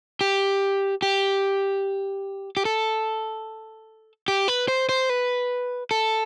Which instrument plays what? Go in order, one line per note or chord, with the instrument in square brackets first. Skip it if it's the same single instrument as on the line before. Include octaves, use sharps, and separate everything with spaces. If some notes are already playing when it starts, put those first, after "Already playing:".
[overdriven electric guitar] G4
G4
G4
A4
G4
B4
C5
C5
B4
A4